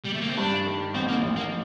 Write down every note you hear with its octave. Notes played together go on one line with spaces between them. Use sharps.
G3
A3
A#3
C4
G2 D4
D#3
A1 C4
A#3
A1
A#3